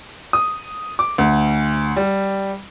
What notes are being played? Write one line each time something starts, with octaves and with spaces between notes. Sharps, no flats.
D#6
D6
D2
G3